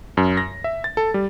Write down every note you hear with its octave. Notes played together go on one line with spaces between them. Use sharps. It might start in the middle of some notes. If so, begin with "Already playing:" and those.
F#2
A#6
E5
A6
A4
G3